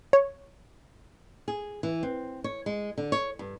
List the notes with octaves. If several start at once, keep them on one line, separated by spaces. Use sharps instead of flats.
C#5
G#4
E3
C4
C#5
G#3
D3
C#5
G2